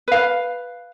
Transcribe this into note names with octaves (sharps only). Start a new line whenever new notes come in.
B4 F5